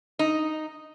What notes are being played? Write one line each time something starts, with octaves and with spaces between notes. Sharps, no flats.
D#4